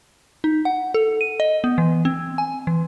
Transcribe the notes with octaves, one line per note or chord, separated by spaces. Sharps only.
D#4
F#5
A4
D#7
D#5
B3
E3
C4
G#5
E3